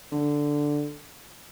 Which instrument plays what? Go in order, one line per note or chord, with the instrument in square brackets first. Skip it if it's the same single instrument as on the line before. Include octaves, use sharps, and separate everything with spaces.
[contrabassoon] D3